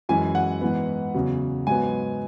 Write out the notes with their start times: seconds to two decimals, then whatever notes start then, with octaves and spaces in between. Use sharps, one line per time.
0.09 F#2 E3 G#3 G#5
0.35 F#5
0.61 G#2 E3 B3
1.15 E2 C#3 F#3
1.67 G#2 F#3 B3 G#5